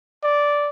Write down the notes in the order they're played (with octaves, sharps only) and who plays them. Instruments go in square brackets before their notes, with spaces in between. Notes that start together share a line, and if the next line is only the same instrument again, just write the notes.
[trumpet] D5